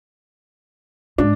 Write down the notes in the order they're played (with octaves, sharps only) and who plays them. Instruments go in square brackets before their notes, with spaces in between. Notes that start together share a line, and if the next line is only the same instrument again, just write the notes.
[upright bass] G#2 [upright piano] D4